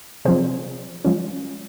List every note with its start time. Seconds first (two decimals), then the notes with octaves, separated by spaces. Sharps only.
0.25 C3 F3 C4 G#4 C5
1.05 F3 G#3 C#4